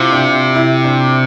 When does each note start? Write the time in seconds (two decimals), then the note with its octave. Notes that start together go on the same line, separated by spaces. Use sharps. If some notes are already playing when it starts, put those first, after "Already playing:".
Already playing: C3 E4 F4
0.12 D4
0.55 E4
0.85 D4